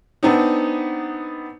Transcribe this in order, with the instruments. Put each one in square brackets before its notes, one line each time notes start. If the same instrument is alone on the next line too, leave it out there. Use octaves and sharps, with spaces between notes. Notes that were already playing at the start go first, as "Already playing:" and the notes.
[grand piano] B3 C4 D4 D#4